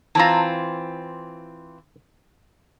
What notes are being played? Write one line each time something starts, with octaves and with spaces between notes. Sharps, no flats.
E3 C4 F4 A5 A#5